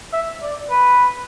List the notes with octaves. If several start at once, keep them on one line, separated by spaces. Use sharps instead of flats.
E5
D5
B4